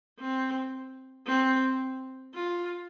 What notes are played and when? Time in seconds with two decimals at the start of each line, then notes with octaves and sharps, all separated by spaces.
0.20 C4
1.27 C4
2.34 F4